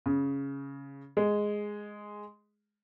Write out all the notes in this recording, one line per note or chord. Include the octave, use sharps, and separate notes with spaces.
C#3
G#3